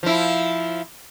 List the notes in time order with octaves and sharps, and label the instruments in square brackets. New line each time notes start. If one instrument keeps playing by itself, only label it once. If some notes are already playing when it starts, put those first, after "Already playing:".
[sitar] F3 E4